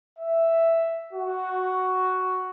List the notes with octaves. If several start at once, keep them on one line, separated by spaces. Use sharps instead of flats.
E5
F#4